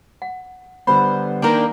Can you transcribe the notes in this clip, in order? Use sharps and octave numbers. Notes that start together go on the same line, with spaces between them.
F#5
D3 G3 B3 C5 B5
D#3 A#3 D4 A#4 G5